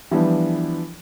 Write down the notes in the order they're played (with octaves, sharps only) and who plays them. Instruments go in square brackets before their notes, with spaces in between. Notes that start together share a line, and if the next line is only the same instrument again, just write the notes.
[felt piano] E3 F3 G3 B3 D4